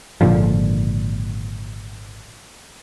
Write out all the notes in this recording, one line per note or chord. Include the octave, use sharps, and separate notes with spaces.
G#1 A#2 D3 F3